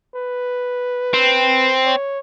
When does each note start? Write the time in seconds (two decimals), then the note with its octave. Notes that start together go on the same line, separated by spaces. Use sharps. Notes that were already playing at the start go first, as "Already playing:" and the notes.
0.15 B4
1.14 C4
1.86 C#5